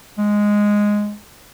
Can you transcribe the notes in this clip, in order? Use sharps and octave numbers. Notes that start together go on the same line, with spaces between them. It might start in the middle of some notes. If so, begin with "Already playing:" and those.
G#3